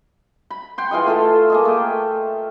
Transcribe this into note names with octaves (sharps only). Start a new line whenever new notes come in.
B5
F#5 G5 C6
E3 F4 G#4 D#5
A3 F4 A4
A#3 G#4 D#5
A3 G5